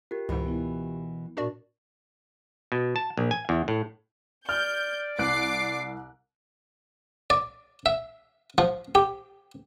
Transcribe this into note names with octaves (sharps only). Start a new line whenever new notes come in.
F4 G4 A#4
C#2 G#2 B2 E3
B3 E4
A#2 D4 F#4 A#4 D5
B2
A5
A#1
G#5
E2
A2
D5 F6 G6
C2 D6 F#6 C7 D7
D5
E5
F3
G4